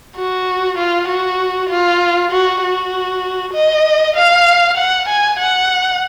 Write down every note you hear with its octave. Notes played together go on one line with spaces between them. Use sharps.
F#4
F4
F#4
F4
F#4
F#4
D#5
F5
F#5
G#5
F#5